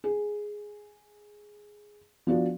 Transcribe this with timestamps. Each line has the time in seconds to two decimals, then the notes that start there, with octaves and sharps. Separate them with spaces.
0.04 G#4
2.27 F3 B3 D4 F#4